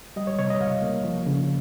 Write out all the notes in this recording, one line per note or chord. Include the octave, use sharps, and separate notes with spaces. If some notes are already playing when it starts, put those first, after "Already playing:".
G3 D#5
C#5
C3 C#5
D#5
C#2 F5
A#3
F3
C#3